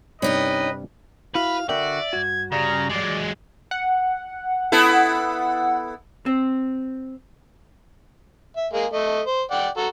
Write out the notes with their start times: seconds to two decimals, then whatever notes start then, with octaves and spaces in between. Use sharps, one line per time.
0.22 G2 C3 G3 C#4 D#4 G4 B4 D#5
1.35 E4 F#4 B4 F5
1.69 D3 F#4 A#4 D5 E5 G5
2.13 G2 F#4 G#6
2.52 C#3 G3 A#5
2.90 F#3 G#3 D5
3.71 F#5
4.72 B3 E4 A4
6.26 C4
8.56 E5
8.73 G#3 A#3 G#4
8.93 A3 D#5
9.26 C5
9.51 D5 F#5 G5
9.77 F#4 A4 A#5